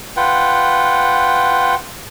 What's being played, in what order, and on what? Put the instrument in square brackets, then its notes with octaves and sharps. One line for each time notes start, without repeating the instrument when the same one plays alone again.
[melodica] F4 B4 F#5 G5